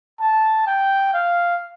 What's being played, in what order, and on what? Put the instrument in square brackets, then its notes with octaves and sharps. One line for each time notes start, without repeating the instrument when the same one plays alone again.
[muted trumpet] A5
G5
F5